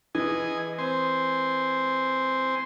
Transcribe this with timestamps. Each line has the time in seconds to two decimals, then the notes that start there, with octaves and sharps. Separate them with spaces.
0.15 E3 G#4 D#5 G#5
0.78 C4 C5 G#5